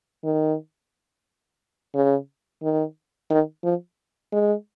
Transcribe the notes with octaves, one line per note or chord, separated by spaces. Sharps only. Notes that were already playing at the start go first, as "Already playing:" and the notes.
D#3
C#3
D#3
D#3
F3
G#3